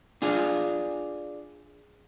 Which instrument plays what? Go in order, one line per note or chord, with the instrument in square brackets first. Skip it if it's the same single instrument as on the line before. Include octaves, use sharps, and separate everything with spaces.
[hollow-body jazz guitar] D4 F4 G#4